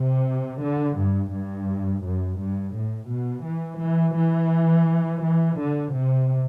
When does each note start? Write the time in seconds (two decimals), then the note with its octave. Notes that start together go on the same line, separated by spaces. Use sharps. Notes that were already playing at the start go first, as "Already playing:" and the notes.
Already playing: C3
0.62 D3
0.99 G2
1.33 G2
2.05 F#2
2.41 G2
2.75 A2
3.11 B2
3.47 E3
3.82 E3
4.18 E3
5.24 E3
5.60 D3
5.95 C3